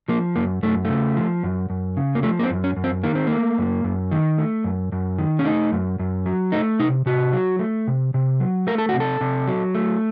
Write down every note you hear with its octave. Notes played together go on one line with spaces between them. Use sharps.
F3 A#3
F#2 A#3
F#2 A3
C#3 A3
F3
F#2
F#2
C#3
A#3
F3 A3
A#3
C4
F#2
C#4
F#2
C4
D#3 A#3
C4
A3 A#3
F#2
F#2
D#3
A3
F#2
F#2
D#3
C#4
A3 D#4
F#2
F#2
F#3
A3 D#4
C3 D#4
C3 F#4
F#3
A3
C3
C3
F#3
A3 A#4
A4
C3 F#4
A4
C3
F#3
A3